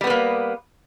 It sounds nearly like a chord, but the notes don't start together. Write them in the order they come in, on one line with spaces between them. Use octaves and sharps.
G3 B3 B4 A#3